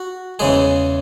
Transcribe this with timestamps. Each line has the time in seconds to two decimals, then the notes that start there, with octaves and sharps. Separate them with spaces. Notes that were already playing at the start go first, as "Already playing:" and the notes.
Already playing: F#4
0.39 E2 C#3 G#3 G#4